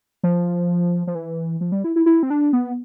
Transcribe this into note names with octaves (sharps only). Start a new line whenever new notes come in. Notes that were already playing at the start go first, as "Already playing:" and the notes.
F3
F3
E3
F3
G3
E4
E4
E4
C4
D4
B3